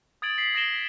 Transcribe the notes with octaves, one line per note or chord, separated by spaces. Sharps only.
D#6 G#6 A6 D7 F#7
B6 C7 F#7
D#6 A#6 D7 E7 G7